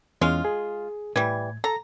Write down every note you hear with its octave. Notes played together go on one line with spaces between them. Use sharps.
E2 G#3 C#4 F4 F6
G#4
A2 E3 G3 G#6
A4 A#5